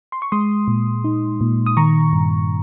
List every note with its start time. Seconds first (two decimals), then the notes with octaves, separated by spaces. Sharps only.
0.12 C6
0.22 C#6
0.32 G#3 C6 D#6
0.68 A#2
1.04 D#4
1.41 A#2
1.66 D#6
1.77 D#3 A#5 C#6
2.13 G2